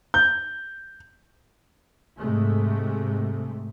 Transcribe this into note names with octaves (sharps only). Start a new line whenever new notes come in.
G6
G#2 C3 G#3 A3